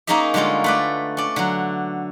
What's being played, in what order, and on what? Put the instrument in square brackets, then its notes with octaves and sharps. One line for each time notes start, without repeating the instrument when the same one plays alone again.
[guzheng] A#3 C#4 D#4 G#4 D#5 E5
D3 G3 G#3 C#4 F4
A3 B4 D5
C#4 D5
D3 F#3